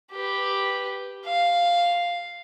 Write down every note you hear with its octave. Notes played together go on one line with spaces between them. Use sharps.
G4 B4
F5